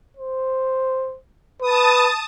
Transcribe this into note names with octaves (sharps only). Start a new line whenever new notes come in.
C5
B4 A5 D#6